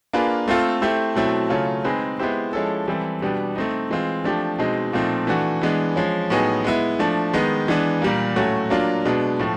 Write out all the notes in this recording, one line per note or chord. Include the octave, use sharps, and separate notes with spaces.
A#3 D4 F4 G#4 B4
A3 C4 F4 A4
A3 C4 E4 G4 C5
B2 F#3 A3 C4 E4
C#3 F#3 A3 C#4 F4
G#3 C4 D#4 G#4 B4
G#3 B3 E4 G4 C5
F3 G#3 C#4 E4 A4
E3 G3 C4 E4 A4
B2 G3 B3 D4 G4
A3 C4 D#4
E3 G#3 C4 F4
F3 A3 D4 G4
B2 G#3 C4 D#4
A#2 F3 A3 C4 D#4
E3 A3 D4 F#4
E3 G#3 B3 D4
F3 G#3 C#4
A2 F#3 B3 D#4 G#4
G#3 B3 E4
F3 A3 D4
D#3 G#3 B3 D#4
E3 G#3 B3 D4
A#2 G3 A#3
A2 F#3 A3 C#4 F#4
F#3 A#3 D4 F4
B2 G#3 B3 D4
A2 F3 A3